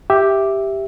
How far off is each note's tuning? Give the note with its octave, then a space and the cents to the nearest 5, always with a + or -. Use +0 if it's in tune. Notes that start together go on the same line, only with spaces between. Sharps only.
G4 +0 E5 +0